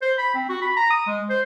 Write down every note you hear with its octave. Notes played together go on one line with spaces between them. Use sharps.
C5
B5
C4
F#4
B5
A#5
D#6
G#3
C5